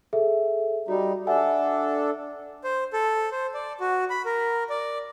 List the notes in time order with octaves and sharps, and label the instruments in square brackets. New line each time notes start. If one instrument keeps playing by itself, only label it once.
[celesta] G#4 A4 E5
[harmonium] G3 D#4 [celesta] F#4
[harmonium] D4 A4 [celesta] E5 F#5 G#5
[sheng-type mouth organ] C5
A4
C5
D5
F#4
B5
A#4
D5